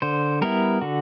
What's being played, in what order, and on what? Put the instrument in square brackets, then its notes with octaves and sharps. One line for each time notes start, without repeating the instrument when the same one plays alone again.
[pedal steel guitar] D3 C5
G3 B3 E4 A#4
D3 F#4